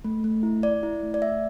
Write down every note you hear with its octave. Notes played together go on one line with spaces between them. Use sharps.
A3
A3
E4
E4 D5
E4
A3
D5
A3 E5